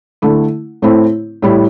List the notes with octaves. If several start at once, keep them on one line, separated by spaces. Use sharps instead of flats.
D3 A3 E4
A2 A3 C4 E4
A2 G3 E4